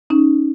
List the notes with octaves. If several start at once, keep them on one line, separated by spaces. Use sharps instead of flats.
C#4 D#4